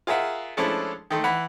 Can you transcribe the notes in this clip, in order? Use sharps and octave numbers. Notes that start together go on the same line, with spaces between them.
F4 G#4 A#4 E5 F#5
F3 G#3 A3 C#4 D4 E4
D#3 A3 C6
E3 F#5 B5